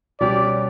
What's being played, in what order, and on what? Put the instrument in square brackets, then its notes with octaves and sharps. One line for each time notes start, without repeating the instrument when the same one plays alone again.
[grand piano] B2 G3 C#4 G4 [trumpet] D5